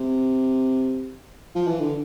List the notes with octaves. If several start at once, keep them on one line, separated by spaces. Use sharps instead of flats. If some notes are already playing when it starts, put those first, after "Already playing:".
Already playing: C3
F3
E3
D3